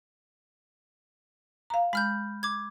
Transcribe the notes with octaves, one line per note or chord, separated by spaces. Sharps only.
F5 A#5
G#3 B5 F6 G6
D6 G#6